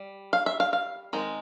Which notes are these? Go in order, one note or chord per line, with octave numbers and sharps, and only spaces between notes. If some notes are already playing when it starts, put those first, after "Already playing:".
Already playing: G3
F5
E5
F5
F5
D#3 G#3 C4 D#4